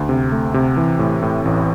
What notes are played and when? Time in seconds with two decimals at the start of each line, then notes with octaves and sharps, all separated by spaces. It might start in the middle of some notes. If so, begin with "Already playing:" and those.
Already playing: D2
0.09 C3
0.32 A3
0.54 C3
0.77 E3
0.99 A2
1.22 A2
1.45 A1